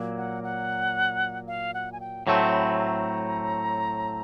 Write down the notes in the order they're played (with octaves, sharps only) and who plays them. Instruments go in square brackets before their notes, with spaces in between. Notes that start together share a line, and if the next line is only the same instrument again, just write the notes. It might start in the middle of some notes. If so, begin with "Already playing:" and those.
Already playing: [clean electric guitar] A#2 F#3 A#3
[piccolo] F#5
F#5
F5
F#5
G#5
G5
[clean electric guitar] A2 F#3 A3 C4 [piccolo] A5
[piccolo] B5
A#5